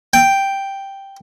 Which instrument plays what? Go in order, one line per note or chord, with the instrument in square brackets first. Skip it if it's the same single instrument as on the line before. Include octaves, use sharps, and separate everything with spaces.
[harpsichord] G5